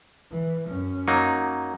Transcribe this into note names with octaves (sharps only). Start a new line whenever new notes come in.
E3
F#2 C#4
F#3 A#3 D#4